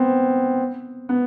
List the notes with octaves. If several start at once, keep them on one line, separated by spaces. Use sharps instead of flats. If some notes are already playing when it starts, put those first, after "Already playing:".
Already playing: B3 C4
B3